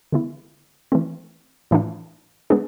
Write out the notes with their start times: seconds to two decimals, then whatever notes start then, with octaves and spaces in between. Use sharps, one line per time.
0.12 D3 G#3 B3 E4
0.92 E3 A3 C4
1.71 A2 E3 A3 D4 F4
2.50 G#3 B3 D4 G#4